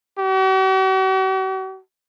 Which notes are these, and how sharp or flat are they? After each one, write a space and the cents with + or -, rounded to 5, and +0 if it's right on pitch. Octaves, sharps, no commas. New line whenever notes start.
F#4 +45